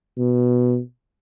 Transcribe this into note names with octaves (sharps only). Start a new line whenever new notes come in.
B2